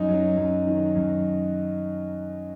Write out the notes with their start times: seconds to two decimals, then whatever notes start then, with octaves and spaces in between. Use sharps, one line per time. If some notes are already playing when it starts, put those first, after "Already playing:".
Already playing: F#2 D#4
0.09 F#3
0.37 F#2
0.67 D#3
0.96 F#2